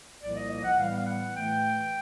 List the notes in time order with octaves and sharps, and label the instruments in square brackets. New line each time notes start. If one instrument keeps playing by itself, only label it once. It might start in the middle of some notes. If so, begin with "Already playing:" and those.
[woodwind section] C2 A#2 F3 A#3 D5
D#5
D#5
F#5
A2 E3 G3 B3 F5
F5
F#5
A2 E3 A3 G5